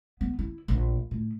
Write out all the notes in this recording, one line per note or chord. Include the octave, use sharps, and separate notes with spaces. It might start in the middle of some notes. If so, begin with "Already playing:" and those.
B3
E4
A#1
A2